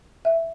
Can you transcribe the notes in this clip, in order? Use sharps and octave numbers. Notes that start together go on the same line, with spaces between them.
E5